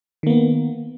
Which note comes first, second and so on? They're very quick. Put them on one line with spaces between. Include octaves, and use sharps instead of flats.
D#3 A#3 B3